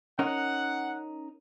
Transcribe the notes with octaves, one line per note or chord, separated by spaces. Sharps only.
C#4 D#4 A#4 F#5